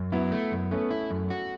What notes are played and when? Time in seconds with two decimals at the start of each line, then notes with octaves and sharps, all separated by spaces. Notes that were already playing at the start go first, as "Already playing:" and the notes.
Already playing: F#2
0.12 F#3 B3 E4
0.32 A3
0.52 F#2
0.71 A3 B3 C#4
0.90 E4
1.11 F#2
1.30 F#4